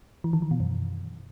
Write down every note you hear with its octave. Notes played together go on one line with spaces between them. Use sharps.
E3
D#3
E3
B2
F#2